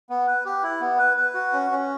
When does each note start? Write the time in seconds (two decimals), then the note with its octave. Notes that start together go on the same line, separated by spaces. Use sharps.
0.10 B3
0.27 B4
0.45 G4
0.63 E4
0.81 B3
0.98 B4
1.17 B4
1.34 F#4
1.53 C#4
1.71 C#4